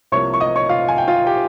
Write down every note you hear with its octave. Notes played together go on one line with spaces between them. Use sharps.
C2 C3 F3 A#3 C#5 C#6
C#6
D#5 D#6
C#5 C#6
F4 F5
G#5
G5
F4 F5
G4 G5